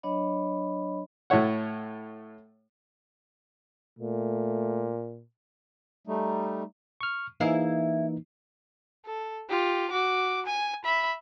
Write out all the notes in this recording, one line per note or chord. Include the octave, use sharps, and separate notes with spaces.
F#3 D4 C#5 D#5 B5
A2 A3 E4 C#5 F#5
A#2 A3
G3 A3 D#4
C#6 F6
E3 A#3 D#4 E4 G#4 F5
A4
F4 G4
F#4 D6
G#5
E5 B5